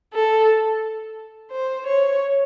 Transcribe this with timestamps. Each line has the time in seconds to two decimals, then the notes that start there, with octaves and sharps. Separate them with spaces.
0.13 A4
1.51 C5
1.85 C#5